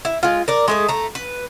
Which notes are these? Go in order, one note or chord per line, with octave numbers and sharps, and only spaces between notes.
E4
G#3 F4
A#4 D5
G#3 A3 G#4
A3 A#5
B4